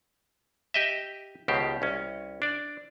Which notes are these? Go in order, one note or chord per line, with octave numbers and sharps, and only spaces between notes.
G4 D#5 E5
C#2 B2 D#3 G4 C5
C2 C#4
D4 D5